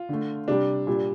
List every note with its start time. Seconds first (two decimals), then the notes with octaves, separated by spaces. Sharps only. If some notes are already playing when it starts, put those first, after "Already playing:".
Already playing: F4
0.09 D3 A3
0.48 C3 G3 D4
0.87 A#2 G3